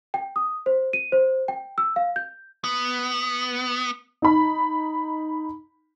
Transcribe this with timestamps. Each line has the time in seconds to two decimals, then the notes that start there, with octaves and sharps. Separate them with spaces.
0.14 G5
0.36 D#6
0.66 C5
0.93 D#7
1.12 C5
1.48 G5
1.78 E6
1.96 F5
2.16 G6
2.64 B3
4.22 D#4 B5